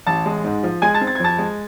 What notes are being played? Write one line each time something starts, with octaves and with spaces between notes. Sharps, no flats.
A1 A5 A6
G#3
G#2
F3
G#3 G#5 G#6
A5 A6
C4
A6
G#6
F2 A5 A6
G#3